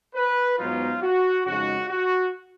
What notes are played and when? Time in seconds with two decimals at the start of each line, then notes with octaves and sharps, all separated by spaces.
0.15 B4
0.58 G#2 F#3 B3 D#4 F4
1.01 F#4
1.44 F2 C#3 G#3 D#4 F#4
1.88 F#4